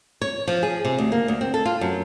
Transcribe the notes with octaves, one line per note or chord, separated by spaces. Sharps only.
C#5
F3
G#4
C3
D2
A#3
D2
C4
A4
F4
F#2